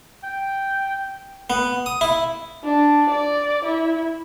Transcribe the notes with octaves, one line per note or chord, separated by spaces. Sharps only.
G5
B3
D#6
E4
D4
D5
E4